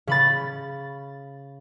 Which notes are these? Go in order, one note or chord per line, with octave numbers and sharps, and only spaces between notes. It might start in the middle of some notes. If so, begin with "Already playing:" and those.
C#3 B5 A6